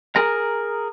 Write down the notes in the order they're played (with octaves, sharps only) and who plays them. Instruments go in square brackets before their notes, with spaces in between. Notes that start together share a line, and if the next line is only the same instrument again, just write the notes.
[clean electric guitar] G#4 A#4 A#5